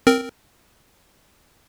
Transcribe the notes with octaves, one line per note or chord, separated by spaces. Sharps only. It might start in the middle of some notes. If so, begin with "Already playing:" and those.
C4 A#4